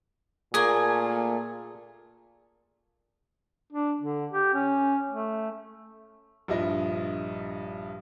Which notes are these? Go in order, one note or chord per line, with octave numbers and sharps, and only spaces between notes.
A#2 A3 A#3 G#4 G#5
D4
D3
G4
C#4
A3
A#1 G2 F3 E4 F4 D#5